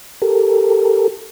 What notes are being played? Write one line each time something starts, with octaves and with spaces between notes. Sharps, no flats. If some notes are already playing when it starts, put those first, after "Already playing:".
G4 A4 A#4